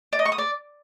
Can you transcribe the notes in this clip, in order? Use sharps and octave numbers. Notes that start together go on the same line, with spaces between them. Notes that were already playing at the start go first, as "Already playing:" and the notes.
D5
D#5
C#6
D#6
D5